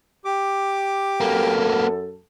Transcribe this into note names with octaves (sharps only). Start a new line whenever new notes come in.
G4 D6
F#2 A#3 B3 A4